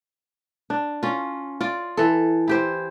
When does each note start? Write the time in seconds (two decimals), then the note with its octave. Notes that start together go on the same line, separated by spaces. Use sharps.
0.70 D4
1.03 C#4 F4
1.61 F4 D5
1.97 E3 A4
2.48 E4 G4 C5